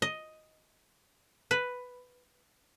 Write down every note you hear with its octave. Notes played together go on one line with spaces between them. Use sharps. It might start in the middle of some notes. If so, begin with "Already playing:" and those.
D#5
B4